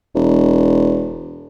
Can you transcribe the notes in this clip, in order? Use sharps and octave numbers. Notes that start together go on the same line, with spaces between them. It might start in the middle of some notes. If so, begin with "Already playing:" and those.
E1